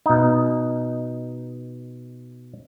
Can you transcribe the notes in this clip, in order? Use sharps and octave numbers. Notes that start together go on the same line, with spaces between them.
B2 D#4